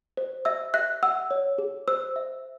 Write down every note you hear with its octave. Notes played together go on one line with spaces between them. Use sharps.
C5
E5 E6
E5 F#6
F#5 E6
C#5
G#4
C5 E6
E5